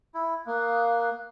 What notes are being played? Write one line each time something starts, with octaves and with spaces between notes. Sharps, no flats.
E4
A#3 F5 D#6 F#6